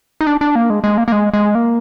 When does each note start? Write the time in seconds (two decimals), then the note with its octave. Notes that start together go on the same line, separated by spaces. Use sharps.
0.21 D#4
0.27 D4
0.41 D4
0.55 A#3
0.70 G#3
0.84 G#3
0.98 A#3
1.08 A#3
1.12 G#3
1.34 G#3
1.55 A#3